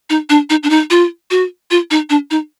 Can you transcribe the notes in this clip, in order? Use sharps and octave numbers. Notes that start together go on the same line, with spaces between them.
D#4
D4
D#4
D4
D#4
F4
F#4
F4
D#4
D4
D#4